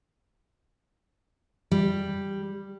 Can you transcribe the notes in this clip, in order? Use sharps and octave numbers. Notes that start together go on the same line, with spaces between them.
G3